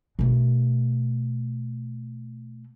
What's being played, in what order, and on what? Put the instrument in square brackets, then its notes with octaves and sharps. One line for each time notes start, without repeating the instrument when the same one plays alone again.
[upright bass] B2 A3